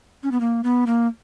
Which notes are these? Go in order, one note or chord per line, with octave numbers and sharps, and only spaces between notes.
C#4
B3
A#3
B3
A#3